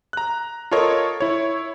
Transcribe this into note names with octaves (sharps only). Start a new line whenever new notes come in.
A#5 F#6
F4 A4 A#4 C#5 D#5
E4 C#5